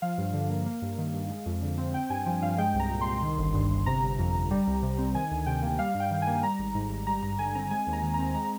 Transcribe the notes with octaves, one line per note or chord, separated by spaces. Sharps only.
F3 F5
G2
D3
A#3
A#3
G2
D#3
G2
G#3
F2
D3
C4
C4 G5
G2 G#5
F3
G2 F5
G#3 G5
C2
A#5
A#2
C6
C2
D#3
G1
G2
G1
C3 A#5
G1
F2
G1
G3
C2
C3
C4
D#3 G#5
D2
C3 G5
A#3
G3 F5
G2
G5
D#3
A#3 G#5
G3 A#5
G#1
G#2
G#1
G3 A#5
G2 A#5
D3 G#5
C4 A#5
G#3 G#5
D#2
A#5
D#3
C4 A#5
G#3 A#5